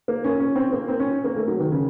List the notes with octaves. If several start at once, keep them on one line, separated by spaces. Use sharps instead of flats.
A#3
C#4
C#4
C4
A#3
C4
C#4
A#3
A3
F#3
D#3
C#3